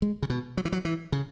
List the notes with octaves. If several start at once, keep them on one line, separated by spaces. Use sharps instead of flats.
G#3
C#3
B2
F#3
E3
F#3
E3
C#3